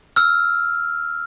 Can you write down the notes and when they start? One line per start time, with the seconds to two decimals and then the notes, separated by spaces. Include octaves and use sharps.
0.16 E6 F6